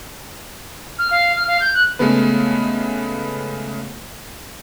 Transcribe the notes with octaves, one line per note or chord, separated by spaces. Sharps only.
F6
F5
F6
F5
G6
F#6
C#3 G#3 A3 B3 B4